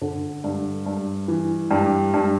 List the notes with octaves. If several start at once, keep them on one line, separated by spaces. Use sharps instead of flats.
D3
G2
G2
E3
G2 G4
G2